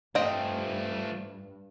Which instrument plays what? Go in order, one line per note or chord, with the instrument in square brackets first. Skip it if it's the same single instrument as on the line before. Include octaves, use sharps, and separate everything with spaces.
[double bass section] G2 [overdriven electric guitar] F3 A3 [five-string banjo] C4 D#5 G5